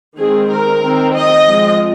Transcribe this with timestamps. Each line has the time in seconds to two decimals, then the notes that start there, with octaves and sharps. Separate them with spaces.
0.18 D#3 G#3 C4 G#4
0.50 A#4
0.82 D#3 C4
1.13 D#5
1.46 F3 G#3 C4